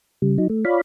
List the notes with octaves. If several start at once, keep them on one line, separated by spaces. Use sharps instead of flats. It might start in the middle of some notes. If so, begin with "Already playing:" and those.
C#3 G3
F#3 D#4
A3
F4 C#5 D5 F5 B5